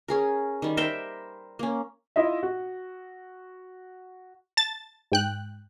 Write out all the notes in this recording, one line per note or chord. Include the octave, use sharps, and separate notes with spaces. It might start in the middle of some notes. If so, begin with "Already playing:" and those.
C#4 G#4 A#4
D#3 G3
A#4 C5 E5 G5
A#3 C#4
E4 F4 D#5 E5
F#4
A5 A6
G#2 G5 F#6